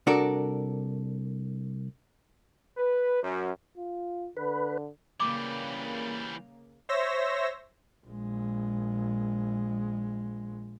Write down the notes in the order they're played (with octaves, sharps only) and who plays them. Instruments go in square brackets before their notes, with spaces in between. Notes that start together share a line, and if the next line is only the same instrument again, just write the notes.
[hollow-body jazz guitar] C2 D4 F#4 A4 A#4 D5
[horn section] B4
F#2
[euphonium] F4
[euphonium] D3 [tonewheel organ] B4
[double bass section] C#3 A#3 [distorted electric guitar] E3 G3 [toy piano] D6
[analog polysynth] C5 C#5 E5 E6 A#6
[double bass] A#1 G#3